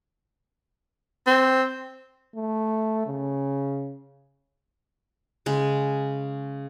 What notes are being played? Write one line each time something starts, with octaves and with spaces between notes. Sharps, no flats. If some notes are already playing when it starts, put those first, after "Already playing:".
C4
A3
C#3
C#3 G#3